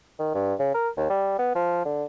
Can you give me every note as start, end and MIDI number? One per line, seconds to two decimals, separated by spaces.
0.19 0.35 51
0.35 0.54 43
0.59 0.72 49
0.74 0.89 70
0.97 1.07 39
1.10 1.35 55
1.39 1.51 59
1.55 1.83 53
1.85 2.05 50